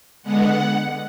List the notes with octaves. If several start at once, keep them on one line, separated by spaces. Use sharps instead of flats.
D3 G#3 B3 F#5